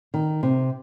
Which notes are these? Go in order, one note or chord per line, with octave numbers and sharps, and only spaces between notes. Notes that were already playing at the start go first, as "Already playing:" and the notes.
D#3
C3